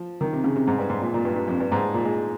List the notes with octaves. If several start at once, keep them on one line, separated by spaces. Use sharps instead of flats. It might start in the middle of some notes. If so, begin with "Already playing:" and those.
Already playing: F3
D#3
C3
C#3
C3
G#2
G2
G#2
A#2
A#2
G2
G2
F2
G2
G#2
A#2
G#3